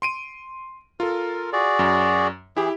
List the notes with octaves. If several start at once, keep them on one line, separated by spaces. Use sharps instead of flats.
C6 D7 D#7
F4 A4 A#4
F#4 G#4 D5
F#2
E3 E4 G4 G#4